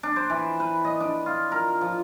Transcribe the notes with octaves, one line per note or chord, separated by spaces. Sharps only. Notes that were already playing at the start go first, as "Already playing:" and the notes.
D4
C5
E3
B4
D#5
D4
F4
A#4
F3